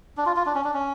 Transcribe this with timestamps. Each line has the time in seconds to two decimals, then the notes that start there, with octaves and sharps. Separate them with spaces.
0.17 D4
0.26 F4
0.36 F4
0.46 D4
0.55 C#4
0.64 D4
0.74 C#4